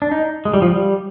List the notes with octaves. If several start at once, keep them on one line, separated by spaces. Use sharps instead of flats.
D4
D#4
G#3
G3
F3
G3